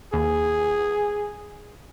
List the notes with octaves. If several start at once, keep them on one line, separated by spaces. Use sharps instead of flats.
D#2 G#4